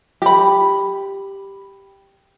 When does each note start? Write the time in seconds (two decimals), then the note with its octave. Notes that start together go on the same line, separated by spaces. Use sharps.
0.22 G4 B5